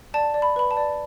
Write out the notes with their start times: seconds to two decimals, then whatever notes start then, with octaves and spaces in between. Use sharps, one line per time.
0.14 D5 A5
0.34 D5
0.42 B5
0.56 B4 B5
0.71 A5
0.77 D5